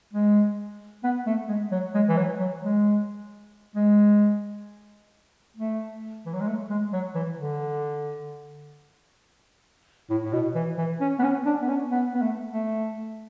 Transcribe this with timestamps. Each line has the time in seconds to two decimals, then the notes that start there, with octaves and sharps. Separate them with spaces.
0.13 G#3
1.04 B3
1.26 A3
1.48 G#3
1.71 F#3
1.94 G#3
2.08 E3
2.16 F#3
2.39 F#3
2.62 G#3
3.75 G#3
5.56 A3
6.26 E3
6.33 F#3
6.40 G#3
6.47 A3
6.70 G#3
6.93 F#3
7.15 E3
7.38 D3
10.10 A2
10.25 A2
10.33 B2
10.55 E3
10.78 E3
11.00 C#4
11.19 B3
11.23 C#4
11.45 D4
11.62 B3
11.68 C#4
11.91 B3
12.14 B3
12.22 A3
12.51 A3